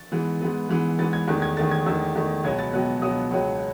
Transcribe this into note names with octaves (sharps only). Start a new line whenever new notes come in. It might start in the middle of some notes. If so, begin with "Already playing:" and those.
Already playing: A6
G#2 E3 B3
G#2 E3 B3
G#2 E3 B3
G#2 E3 B3 A6
G#6
E2 D#3 A3 F#6
G#6
E2 D#3 A3 A6
G#6
E2 D#3 A3 E6
E2 D#3 A3
C#2 B2 F#3 B3 G#6
A6
C#2 B2 F#3 B3 F#6
C#2 B2 F#3 B3 D#6
C#2 B2 F#3 B3